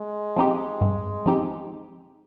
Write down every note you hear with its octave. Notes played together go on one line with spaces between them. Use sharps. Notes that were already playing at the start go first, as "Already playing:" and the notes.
Already playing: G#3
F3 C4 D#4 G4
G2
F3 C4 D#4 G4